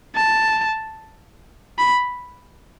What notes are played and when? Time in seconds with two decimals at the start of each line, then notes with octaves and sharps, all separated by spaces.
0.16 A5
1.78 B5